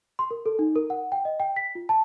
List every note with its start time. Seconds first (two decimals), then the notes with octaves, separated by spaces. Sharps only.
0.19 C6
0.31 A#4
0.46 A4
0.59 D#4
0.76 A#4
0.90 F#5
1.12 G5
1.25 D#5
1.40 G5
1.56 B6
1.75 F4
1.89 A5